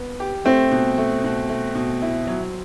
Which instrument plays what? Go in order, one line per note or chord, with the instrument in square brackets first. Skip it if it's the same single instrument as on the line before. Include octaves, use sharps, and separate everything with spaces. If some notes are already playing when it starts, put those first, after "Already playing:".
Already playing: [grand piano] B3
G4
[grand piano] A3 [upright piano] C4
[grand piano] B2
A3
B2
A3
B2
E4
F#3